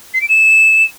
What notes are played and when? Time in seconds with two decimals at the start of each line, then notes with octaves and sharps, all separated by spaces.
0.14 C7
0.21 D7
0.29 E7